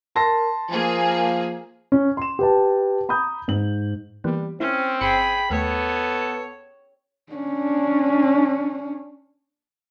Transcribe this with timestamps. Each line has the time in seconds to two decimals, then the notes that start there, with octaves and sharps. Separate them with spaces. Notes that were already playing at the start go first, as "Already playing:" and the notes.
0.16 A#4 A5 C6 A#6
0.70 F3 A#3 G#4
1.92 C#4
2.17 C6 E7
2.39 G4 B4 A5
3.09 A#5 B5 D#6 G6
3.48 G#2 F#7
4.24 E3 G3 A#3 B3
4.60 C4 C#4 E4
5.01 G1 G#4 G5 B5 C#7
5.50 D#2 A3 B3 A4 C#5
7.33 C#4 D4